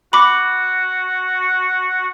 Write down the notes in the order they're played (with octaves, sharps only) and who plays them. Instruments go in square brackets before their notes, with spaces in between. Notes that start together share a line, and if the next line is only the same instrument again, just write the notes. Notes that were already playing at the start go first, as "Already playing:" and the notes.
[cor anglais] F#4 [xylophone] B5 D6